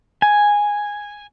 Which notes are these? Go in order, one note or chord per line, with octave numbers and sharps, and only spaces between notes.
G#5